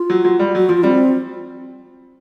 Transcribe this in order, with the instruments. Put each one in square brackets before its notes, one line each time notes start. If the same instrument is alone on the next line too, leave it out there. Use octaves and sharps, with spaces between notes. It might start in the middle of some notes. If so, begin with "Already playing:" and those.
Already playing: [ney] F4
[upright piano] F#3
F#3
G3
[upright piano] F#3 [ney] F#4
[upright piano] F3 [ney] F4
[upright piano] G3 [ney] C4